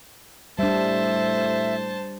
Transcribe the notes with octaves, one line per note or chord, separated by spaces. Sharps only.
A2 G3 D4 C5 E5 A5